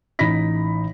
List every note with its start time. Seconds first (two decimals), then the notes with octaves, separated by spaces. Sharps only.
0.19 A1 D#4 B5 A#6 B6